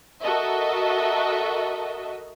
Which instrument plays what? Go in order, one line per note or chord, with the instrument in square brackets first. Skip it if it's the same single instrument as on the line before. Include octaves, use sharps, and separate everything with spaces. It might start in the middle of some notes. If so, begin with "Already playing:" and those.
[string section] F#4 A4 A#4 D#5 E5